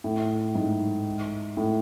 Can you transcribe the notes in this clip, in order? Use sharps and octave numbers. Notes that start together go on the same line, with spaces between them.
A2
G#2
A2